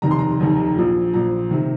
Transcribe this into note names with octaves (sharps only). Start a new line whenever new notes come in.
F1 D#2 D#3 A#5
C6
A#5
F1 D#2 D#3
A#1 A#2 F3
A#1 A#2 F3 A#5
C3 D#3